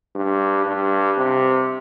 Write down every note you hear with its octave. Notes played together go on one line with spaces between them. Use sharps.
G2
G2
C3